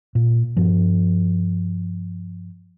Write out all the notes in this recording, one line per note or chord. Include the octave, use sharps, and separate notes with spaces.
A#2
G2 F3